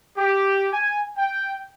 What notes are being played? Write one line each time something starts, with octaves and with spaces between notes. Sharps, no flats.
G4
G#5
G5